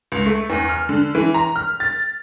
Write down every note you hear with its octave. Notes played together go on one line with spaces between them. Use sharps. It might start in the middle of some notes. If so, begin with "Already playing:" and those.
C#2
A3
E2
F6
D3
E3
A#5
F6
A6